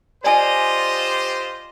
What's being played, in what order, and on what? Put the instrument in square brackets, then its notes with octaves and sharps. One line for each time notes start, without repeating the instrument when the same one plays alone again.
[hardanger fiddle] F4 D#5 [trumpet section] G4 C5 [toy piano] D5 G#5